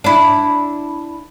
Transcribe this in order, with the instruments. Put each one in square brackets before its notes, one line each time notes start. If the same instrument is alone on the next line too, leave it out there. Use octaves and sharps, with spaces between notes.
[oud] D4 E4